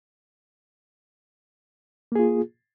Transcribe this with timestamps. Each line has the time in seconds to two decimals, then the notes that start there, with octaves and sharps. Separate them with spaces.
2.12 A#3
2.16 G#4
2.19 F4